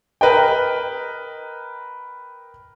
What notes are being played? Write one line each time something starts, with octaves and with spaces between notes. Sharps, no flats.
A#4 B4 D#5 G5